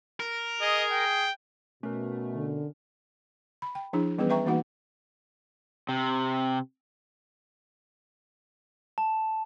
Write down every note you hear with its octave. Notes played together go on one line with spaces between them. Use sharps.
A#4
G#4 D#5
G5
B2 A3 C#4 A#4
D3
B5
G5
F3 D4 E4 G#4
E3 G3 B3 C#4 G#4 B4
B4 E5 G5 A#5 C#6
E3 A#3 D#4 F#4 F#5
C3
A5